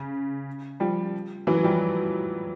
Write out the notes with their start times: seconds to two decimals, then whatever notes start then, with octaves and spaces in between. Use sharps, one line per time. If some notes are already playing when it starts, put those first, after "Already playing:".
Already playing: C#3
0.80 F3 G3
1.47 E3 F#3
1.64 F3 G3